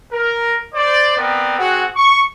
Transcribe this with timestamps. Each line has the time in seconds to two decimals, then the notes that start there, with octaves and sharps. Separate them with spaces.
0.12 A#4
0.74 C5 D5
1.17 B3 C4 A#4 D5
1.58 C4 F#4 G#4 F#5
1.95 C#6